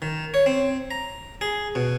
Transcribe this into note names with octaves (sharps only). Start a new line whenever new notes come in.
D#3
C#5
C4
A#5
G#4
B2